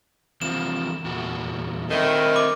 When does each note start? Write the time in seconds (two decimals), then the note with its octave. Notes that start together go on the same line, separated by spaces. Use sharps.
0.42 C3 E3 F3 E7
1.04 E2 A#2 F#4
1.90 D2 D#3 C4 E4
2.34 B5 D6